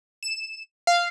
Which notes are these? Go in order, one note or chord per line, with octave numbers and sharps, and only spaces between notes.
E7
F5